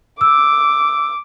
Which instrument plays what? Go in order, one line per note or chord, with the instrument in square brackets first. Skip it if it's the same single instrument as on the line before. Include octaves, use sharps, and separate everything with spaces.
[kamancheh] D6 [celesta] E6